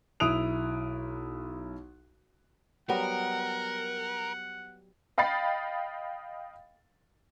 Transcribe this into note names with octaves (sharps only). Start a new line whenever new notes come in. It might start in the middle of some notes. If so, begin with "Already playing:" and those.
B1 E4 D#6 F#6 D7 F7
F#3 G3 B3 A#4 F#5
D#5 F5 G5 B5 A6 C7